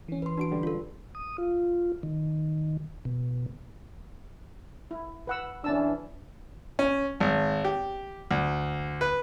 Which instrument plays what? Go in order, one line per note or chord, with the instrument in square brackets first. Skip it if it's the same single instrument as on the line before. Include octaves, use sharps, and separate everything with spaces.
[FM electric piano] E3 C#4
[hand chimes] B4 C6
[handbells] D4 F#4 D7
[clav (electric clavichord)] D3 G3
[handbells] F4 A4
[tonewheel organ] D#6
F4
D#3
B2
[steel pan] E4
B4 F#5 E6
[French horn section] E3 D4 [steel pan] C#4 A5 E6
[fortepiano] C#4
G#1
G4
D2
B4